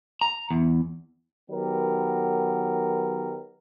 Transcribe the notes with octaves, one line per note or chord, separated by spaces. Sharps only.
A#5
E2
D#3 F#3 B3 G4 A#4